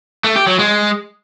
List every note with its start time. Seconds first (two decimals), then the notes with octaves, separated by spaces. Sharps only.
0.24 A3
0.36 G4
0.47 F#3
0.59 G#3